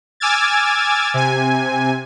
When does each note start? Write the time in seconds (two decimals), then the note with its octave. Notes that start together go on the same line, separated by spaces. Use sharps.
0.20 G#5 D6 E6 F6 G#6 A6
1.14 C3 G#5